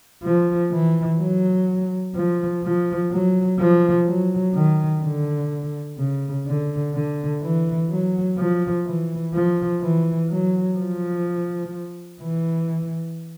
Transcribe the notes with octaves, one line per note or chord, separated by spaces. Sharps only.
F3
E3
F#3
F3
F3
F#3
F3
F#3
D#3
D3
C#3
D3
D3
E3
F#3
F3
E3
F3
E3
F#3
F3
E3